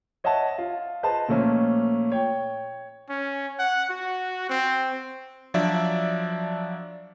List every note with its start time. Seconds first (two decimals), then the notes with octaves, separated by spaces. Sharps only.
0.24 C#5 D#5 E5 F#5 A5
0.58 F4
1.03 G#4 B4 C5 D#5 A5
1.28 A#2 F3 A3 A#3 C#4
2.12 C#5 G5
3.10 C#4
3.59 F#5
3.90 F#4
4.50 C4
5.54 F3 F#3 D4 D5 E5